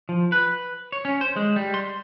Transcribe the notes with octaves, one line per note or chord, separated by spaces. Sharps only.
F3
B4
C#5
C#4
C5
G#3
G3
C6